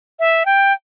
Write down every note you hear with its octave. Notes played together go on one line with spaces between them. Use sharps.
E5
G5